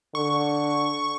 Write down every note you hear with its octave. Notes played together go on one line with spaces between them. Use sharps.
D3 C#6